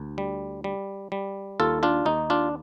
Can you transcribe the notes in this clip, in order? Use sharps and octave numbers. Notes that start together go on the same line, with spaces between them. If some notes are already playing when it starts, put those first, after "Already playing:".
Already playing: D2
G3
G3
G3
D#2 F4 A4
D4 F4
D#2 D#4
D4 F4